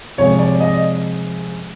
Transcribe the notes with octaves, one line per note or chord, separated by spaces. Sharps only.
C3 F3 G#3 C#5
D5
D#5